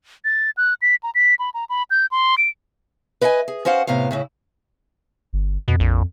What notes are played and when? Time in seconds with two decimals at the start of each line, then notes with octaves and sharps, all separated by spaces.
0.25 A6
0.57 F#6
0.82 B6
1.03 A#5
1.15 B6
1.39 B5
1.54 A#5
1.69 B5
1.91 G6
2.11 C6
2.38 D7
3.21 B4 D#5 E5 F#5 G#5
3.48 G#4
3.65 C#4 F#4 C5 F5 F#5
3.87 A2 C3 B3 F5
4.11 A2 C#3 E4
5.33 G1
5.68 F2 B2
5.80 A#1